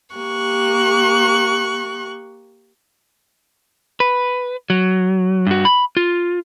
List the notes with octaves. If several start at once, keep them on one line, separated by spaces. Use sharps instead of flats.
A#3 G4 C#6 F#6
B4
F#3
G2 F#4
B5
F4